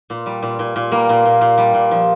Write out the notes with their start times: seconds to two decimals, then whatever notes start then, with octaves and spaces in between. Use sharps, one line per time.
0.10 A#2
0.26 G3
0.43 A#2
0.59 A#2
0.76 A#2
0.92 G3 A#3
1.09 A#2
1.25 A#2
1.41 A#2
1.58 G3
1.74 A#2
1.91 F3